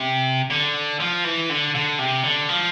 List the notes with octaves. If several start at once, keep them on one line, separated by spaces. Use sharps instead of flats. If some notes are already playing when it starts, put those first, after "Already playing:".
Already playing: C3
D3
F3
E3
D3
D3
C3
D3
F3